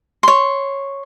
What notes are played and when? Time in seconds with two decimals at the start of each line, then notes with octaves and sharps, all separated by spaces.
0.23 C#5 C6